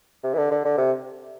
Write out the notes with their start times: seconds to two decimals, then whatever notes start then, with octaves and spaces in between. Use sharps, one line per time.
0.23 C3
0.34 E3
0.38 D3
0.51 D3
0.64 D3
0.77 C3